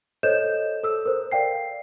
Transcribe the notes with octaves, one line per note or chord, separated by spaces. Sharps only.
A4 C5 C#5 D#5 G6 E7
A4 E6
A#4 C5
D5 F5 G5 C7